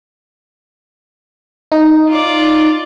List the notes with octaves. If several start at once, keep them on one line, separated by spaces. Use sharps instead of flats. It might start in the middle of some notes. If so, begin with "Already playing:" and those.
D#4
F4 D5